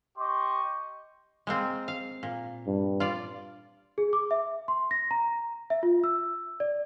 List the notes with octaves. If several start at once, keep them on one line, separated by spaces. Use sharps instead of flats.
G4 D#5 C6 C#6
G#3 A#3 C4
F5
A#2
G2
F4 D5
G#4
D6
E5
C6
A#6
A#5
E5
F4
E6
D5